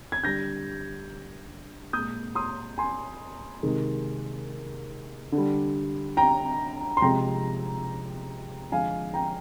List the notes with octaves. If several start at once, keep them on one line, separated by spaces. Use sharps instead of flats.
G#6
D3 G3 G6 A#6
A#2 G#3 D#6 G6
C6 D#6
G#5 C6
C3 D#3 G#3
D3
G3
G5 A#5
C6
C3 F3 G#3 G5 A#5
D3 F3 G#3 F5 G#5
G5 A#5